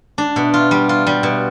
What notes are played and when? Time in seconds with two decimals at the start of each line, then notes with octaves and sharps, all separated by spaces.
0.18 D4
0.36 B2
0.54 F4
0.71 G3
0.89 F4
1.07 G3
1.23 B2